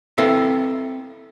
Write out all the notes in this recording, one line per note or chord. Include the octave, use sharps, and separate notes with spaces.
C4 E4 A4 B4 E5 F5